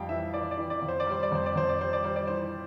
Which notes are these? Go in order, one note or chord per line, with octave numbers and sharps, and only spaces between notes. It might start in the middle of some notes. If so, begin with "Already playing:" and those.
Already playing: F2 G3 F5 G5
E3 E5
E3 D5
D5
E3
D5
F2
C5
D5
G3 C5
D5
F2 C5
D5
F2 C5
D5
G3 C5
D5
G3 C5
D5
E3 C5